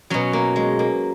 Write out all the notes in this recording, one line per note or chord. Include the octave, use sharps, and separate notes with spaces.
B2 F#3 C#4
A#3
G#3
A#3